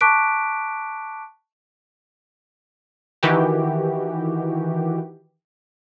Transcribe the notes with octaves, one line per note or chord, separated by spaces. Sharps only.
A5 C#6 D6 F#6 B6 D7
D#3 E3 F#4 G4